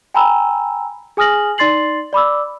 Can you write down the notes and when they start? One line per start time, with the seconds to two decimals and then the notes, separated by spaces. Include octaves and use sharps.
0.14 G5 G#5 A#5 B5 E6
1.17 G#4 G#5 D#6 F6 A#6 F#7
1.58 D#4 D5 C6 A6 C7 F#7
2.13 D5 B5 D6 E6